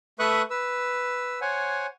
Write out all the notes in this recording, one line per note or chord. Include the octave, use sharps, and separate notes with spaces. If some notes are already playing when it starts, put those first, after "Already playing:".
A3 B4 E5 C#6 D#6 F#6
B4 E6
C5 C#5 F#5 G#5